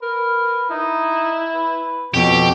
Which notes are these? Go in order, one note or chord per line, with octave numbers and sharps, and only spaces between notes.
A#4 B4
D#4 E4
B4
F2 B2 G4 C#5